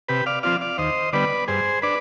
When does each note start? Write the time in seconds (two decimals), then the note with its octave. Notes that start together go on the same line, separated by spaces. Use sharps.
0.09 C3 G4 B4
0.26 D5 F5
0.43 F3 C4 F4 D5 F5
0.61 D5 F5
0.78 D#2 C5 D#5
1.13 D3 G3 B3 B4 D5
1.48 G2 G#4 C5
1.82 D4 B4 D5